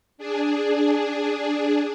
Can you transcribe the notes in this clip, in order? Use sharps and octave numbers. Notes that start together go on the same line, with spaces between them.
D4 G#4